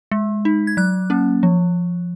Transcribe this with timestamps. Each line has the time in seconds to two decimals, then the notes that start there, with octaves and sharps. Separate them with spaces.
0.12 G#3
0.45 D#4
0.67 G#6
0.77 F#3 F#6
1.10 A#3 C#4
1.43 F3